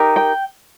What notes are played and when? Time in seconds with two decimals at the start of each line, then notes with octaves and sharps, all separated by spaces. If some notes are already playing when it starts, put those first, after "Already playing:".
Already playing: D#4 G4 A#4
0.16 G5